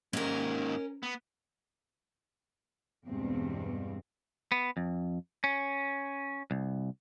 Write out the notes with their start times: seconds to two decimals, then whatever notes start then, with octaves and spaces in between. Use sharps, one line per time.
0.13 D#2 G#2 C#4 A#4
1.03 B3
3.06 E2 G2 B2 G#3 C4
4.52 B3
4.77 F2
5.44 C#4
6.51 C2